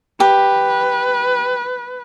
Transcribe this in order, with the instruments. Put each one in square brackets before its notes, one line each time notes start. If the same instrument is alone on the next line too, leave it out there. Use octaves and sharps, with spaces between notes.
[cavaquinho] G4 [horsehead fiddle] B4